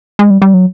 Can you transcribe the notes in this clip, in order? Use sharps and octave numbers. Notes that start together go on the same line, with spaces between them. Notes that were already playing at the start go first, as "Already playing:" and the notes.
G#3
G3
G3
F#3